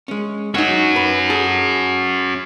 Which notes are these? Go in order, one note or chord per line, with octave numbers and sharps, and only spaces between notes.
G#3 C#4
C#4 D#4 F#4 C#5
B4
G#4 A4